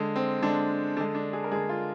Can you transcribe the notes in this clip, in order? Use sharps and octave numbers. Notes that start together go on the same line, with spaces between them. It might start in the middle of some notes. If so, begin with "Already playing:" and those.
Already playing: D3 G#3
C4
D3 G#3 D4
D3 G#3 D4
D4
G#4
A#4
D3 G#3 G#4
F4